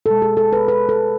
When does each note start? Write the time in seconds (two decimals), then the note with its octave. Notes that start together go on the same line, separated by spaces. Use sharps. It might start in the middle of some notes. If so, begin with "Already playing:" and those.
0.06 B2 G#3 A4
0.22 G#4
0.37 A4
0.53 B4
0.68 B4
0.89 A4